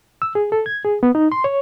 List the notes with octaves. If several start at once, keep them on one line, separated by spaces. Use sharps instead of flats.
E6
G#4
A4
G#6
G#4
B3
D#4
C6
C#5